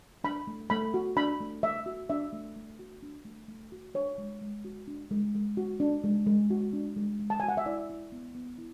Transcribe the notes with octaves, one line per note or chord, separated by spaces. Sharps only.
D4 B5
A3
A3 B5
F#4
D4 B5
A3
A3 E5
F#4
D4 E5
A3
A3
F#4
D4
A3
A3
F#4
D4 C#5
G#3
G#3
F#4
D4
G#3
G#3
F#4
D4
G#3
G#3
F#4
D4
G#3
G#3
A5
F#4 G#5
F#5
E5
E4 D5
E4
B3
B3
E4